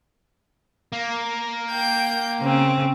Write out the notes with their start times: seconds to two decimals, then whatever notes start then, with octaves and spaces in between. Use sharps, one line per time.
0.93 A#3
1.70 G5 G6
2.41 C#3 C4